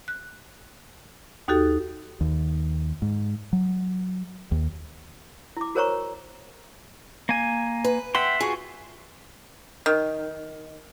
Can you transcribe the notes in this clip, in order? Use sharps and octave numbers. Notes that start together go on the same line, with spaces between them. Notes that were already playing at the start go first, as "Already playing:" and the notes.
F#6
D#2 D#4 F#4 G4 A4
D#2
G#2
F#3
D#2
E4 D6
F#4 A#4 C5 C#5 A#5 C#6
A#3 G#5
B4
E5 F#5 G5 C6
F4 F#4 G#4
D#3